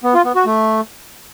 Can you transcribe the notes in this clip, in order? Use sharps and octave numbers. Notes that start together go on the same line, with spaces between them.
B3
F4
B3
F#4
A3